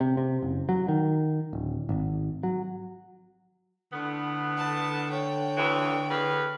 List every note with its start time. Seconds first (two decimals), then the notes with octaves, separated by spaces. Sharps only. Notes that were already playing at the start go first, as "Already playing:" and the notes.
0.01 C3
0.17 C3
0.42 F#1
0.69 F#3
0.88 D#3
1.53 D1
1.89 G#1
2.43 F#3
3.93 A2 D3 B3
4.57 A5
5.09 C#5 G5
5.57 D2 E3
6.10 E2 B4 F5